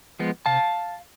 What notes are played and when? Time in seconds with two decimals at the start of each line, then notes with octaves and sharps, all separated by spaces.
0.19 F3 G#3 B3
0.46 C3 F5 A5